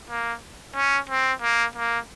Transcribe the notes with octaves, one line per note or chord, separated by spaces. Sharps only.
A#3
C#4
C4
A#3
A#3